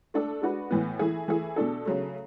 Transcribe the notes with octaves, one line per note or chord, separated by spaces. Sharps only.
A3 D4 A4
G#3 D4 F#4 B4
A2 E3 B3
E3 A3 E4 G#4
E3 A3 E4 G#4
B2 A3 D4 A4
C#3 F#3 A3